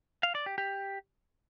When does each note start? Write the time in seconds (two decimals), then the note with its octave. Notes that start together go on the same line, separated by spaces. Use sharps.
0.23 F5
0.35 D5
0.46 G4
0.58 G4